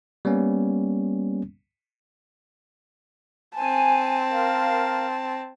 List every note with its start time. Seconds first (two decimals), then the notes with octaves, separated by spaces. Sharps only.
0.25 G3 A#3 B3 C#4
3.56 C4 G#5 A5
4.30 A#4 F5